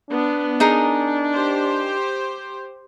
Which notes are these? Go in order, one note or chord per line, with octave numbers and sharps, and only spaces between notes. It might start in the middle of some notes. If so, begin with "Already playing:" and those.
B3 D4
D#4 G#4 A#4
G4 C5